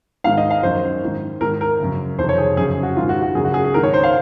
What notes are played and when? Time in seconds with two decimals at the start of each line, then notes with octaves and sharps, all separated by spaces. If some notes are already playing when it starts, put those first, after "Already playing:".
0.24 G#2 F5
0.27 D#3
0.38 D#5
0.50 F5
0.63 F#2 D#3 C5
1.02 G#2 D#3
1.41 G#2 D#3 A#4
1.61 A#4
1.80 F#2 C#3
2.18 F2 C3 D#3 C5
2.29 C#5
2.38 G#4
2.57 F#2 C#3 G#4
2.83 F#4
2.96 G#2 D#3 F4
3.09 F#4
3.22 F#4
3.35 F#2 C#3 G#4
3.45 F#4
3.54 G#4
3.64 G#4
3.74 G#2 D#3 A#4
3.83 C#5
3.94 C5
4.03 F5